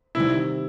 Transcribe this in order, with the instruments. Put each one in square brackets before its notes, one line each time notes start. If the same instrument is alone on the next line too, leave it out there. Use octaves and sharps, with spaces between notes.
[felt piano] C3 D#3 G3 [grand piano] E4